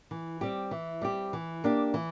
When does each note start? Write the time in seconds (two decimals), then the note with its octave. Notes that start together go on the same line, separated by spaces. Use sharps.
0.11 E3
0.41 G3 C4 G4
0.71 E3
1.02 G3 C4 G4
1.33 E3
1.64 A#3 D4 G4
1.94 E3